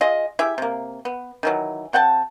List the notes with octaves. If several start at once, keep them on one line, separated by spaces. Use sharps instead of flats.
F4 G#4 D#5
E4 G4 G#4 E5
C3 A#3
B3
D#3 E3 F#3
C3 F#5 G5 A5